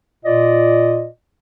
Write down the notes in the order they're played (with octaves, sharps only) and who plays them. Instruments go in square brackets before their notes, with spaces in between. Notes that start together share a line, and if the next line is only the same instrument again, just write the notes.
[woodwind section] A#2 F4 D5 D#5